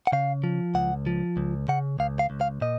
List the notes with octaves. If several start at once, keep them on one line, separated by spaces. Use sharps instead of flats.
F#5
C#3 F5
F3
C#2 F#5
F3
C#2
C#3 F#5
C#2 F5
F5
C#2
F5
A#2 D#5